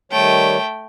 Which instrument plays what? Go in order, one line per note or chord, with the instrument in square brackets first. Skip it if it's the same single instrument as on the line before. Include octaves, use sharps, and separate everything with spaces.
[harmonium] D#3 G3 C#5 [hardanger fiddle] A3 G5